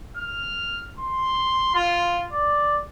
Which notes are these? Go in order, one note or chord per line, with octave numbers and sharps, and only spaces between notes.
F6
C6
F4
D5